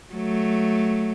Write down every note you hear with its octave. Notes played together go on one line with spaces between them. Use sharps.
F#3 A3